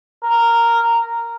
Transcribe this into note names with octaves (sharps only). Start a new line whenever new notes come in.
A#4